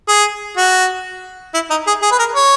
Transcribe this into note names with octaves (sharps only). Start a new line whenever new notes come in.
G#4
F#4
E4
D#4
G#4
G#4
B4
A#4
C#5